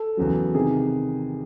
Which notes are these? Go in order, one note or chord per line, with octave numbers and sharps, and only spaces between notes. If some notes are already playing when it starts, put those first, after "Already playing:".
Already playing: A4
E2 C#3 F#3
C3 D#3 G#4